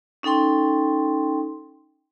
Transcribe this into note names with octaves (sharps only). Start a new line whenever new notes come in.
C#4 D#4 A4 G5 C6